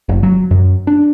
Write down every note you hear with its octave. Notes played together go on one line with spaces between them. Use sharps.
F#1
F#3
F#2
D4